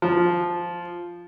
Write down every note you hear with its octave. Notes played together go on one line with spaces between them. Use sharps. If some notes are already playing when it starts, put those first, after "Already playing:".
F3